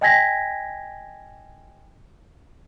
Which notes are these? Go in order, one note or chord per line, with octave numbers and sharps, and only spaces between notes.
D#5 G5 G#5 G#6 A#6 B6